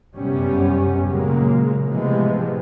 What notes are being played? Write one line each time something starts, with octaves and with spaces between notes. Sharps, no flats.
G1 F#2 C3 G3 B3 C#4
A#2 C#3 F#3 G#3 A#3
A2 C3 E3 F3 G#3 B3